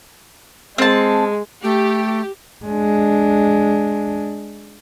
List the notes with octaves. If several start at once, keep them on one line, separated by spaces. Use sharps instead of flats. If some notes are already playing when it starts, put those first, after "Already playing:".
G#3 C4 A5
A3 G4
G#3 D4